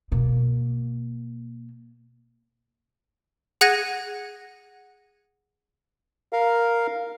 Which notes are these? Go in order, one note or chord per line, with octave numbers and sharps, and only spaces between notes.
B2 A#3
G#4 F#5 F#6 G#6 A#6 D#7
A#4 F5